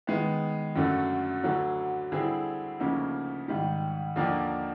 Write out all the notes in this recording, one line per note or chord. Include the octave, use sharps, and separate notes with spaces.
D#3 G#3 B3
F#2 D3 F#3 A3
D2 D3 F#3
D3 G3 C4 E4 G#4
D2 C#3 F3 A#3 D#4
G#2 D#3 G3
D#2 D3 F3 A#3 D4